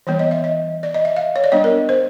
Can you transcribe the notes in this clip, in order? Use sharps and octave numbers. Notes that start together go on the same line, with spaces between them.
E3 G3 B3 C#5
D#5
E5
D#5
D5
D#5
E5
F5
C#5
D5
G3 B3 D4 D#5
A#4
C5